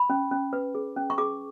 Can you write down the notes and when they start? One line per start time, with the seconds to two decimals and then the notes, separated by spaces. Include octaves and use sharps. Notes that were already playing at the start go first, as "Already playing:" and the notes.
Already playing: B5
0.10 C#4
0.31 C#4
0.53 B4
0.75 G#4
0.96 C#4
1.10 C#6
1.18 G#4 D6